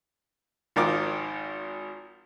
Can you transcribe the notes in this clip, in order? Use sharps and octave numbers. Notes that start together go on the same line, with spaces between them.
G#1 D#3 F3 F4 A#4 D6